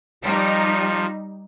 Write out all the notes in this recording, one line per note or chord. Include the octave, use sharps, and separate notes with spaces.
F3 G3 D#4